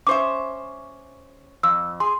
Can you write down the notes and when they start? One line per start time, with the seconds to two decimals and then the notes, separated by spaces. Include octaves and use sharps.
0.07 C#4 C5 E5 D6
1.63 F2 E6
2.00 G#4 C6